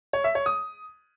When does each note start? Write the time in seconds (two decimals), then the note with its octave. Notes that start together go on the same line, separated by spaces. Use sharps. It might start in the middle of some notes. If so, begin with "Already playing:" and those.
0.13 C#5
0.24 E5
0.35 C#5
0.46 D#6